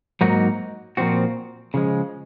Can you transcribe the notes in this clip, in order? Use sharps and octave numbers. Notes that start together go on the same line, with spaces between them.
G#2 F#3 A#3 D#4 F#4
A#2 F3 C4 F#4
C#3 F3 G#3